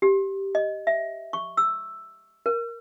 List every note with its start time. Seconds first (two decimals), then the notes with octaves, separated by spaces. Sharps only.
0.02 G4
0.55 D#5
0.87 E5
1.33 C#6
1.57 E6
2.46 A#4